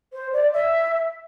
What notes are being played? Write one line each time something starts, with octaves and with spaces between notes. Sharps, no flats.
C5
D5
E5